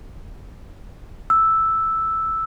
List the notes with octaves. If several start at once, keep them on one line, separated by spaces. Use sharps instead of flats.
E6